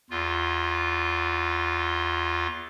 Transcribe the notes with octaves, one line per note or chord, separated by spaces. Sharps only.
E2 F4